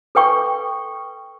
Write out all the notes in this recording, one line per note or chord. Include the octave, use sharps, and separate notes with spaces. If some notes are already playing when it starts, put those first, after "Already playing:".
A4 B4 G5 C#6